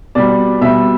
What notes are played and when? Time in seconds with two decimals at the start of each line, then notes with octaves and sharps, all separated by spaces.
0.15 B2 G3 D5
0.61 B2 G3 E5